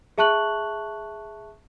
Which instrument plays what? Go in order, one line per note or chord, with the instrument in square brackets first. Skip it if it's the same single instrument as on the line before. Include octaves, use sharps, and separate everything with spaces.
[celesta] G#4 E5 A5 C#6 F#6 F#7